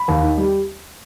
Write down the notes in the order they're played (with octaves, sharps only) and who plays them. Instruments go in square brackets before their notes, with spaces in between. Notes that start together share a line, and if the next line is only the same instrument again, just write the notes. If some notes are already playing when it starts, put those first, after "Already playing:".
Already playing: [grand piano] B5
D#2
D#3
G3